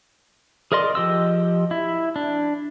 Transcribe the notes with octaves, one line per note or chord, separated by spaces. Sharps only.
G#4 A#4 D5 D#5 C6
F3 G4 D#5 E6
E4
D4